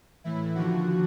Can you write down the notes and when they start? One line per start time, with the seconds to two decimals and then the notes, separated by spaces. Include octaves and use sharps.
0.24 A2 E3 E4
0.55 D#2 D3 F3 F#4